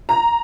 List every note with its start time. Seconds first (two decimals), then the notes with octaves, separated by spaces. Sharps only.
0.09 A#5